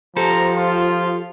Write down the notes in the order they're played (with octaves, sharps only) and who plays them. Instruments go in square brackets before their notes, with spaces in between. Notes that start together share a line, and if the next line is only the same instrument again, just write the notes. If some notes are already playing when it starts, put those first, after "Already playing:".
[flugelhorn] F3 [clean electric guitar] G4 A4 C5 [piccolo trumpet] A#5
[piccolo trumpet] F4